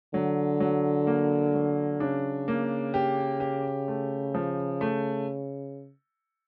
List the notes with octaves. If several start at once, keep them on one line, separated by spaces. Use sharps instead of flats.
D3 F#3
F#3
A#3
F#3
C#3 D4
A#3
G4
G4
A3
F3
A3